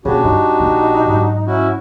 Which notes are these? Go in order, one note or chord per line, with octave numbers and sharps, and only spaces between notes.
A#2 C#3 D4 F#4 G4
G2 D#4
A#1
G#2 F#3
C#4 E4 F#4